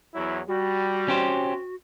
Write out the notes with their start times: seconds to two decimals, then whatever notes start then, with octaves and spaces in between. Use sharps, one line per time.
0.14 E2 F#3 E4
0.48 G3 F#4
1.08 C#4 G4 C5